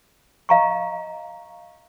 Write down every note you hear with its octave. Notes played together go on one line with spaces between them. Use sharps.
D#5 F5 A#5 C#6